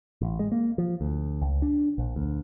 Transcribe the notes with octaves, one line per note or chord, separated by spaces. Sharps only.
A1
G#3
A#3
F3
D2
C#2
D4
A#1
D2